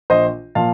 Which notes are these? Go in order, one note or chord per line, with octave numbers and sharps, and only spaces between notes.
A#1 C5 D#5
A#2 F3 F5 A5